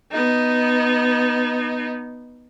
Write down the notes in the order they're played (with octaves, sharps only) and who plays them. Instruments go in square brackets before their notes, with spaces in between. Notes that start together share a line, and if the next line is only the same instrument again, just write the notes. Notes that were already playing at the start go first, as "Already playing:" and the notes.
[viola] B3 D#4